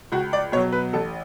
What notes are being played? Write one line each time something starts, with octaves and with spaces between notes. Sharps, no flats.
C#2 F#4
D5
B2 F#3 C#5
B4
A1 A4